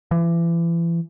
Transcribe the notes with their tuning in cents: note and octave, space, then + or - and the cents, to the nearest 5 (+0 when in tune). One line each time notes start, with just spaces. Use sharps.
E3 +35